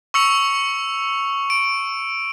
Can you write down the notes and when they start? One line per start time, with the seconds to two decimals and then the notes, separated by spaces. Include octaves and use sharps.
0.14 C#6 E6 C#7 F7
1.50 D7